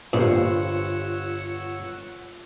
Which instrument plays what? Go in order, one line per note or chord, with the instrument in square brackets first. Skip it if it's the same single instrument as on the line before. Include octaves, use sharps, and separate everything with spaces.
[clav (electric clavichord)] G1 G2 [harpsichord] A#2 [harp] F4 C5 [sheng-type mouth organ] C#5 F#5 E6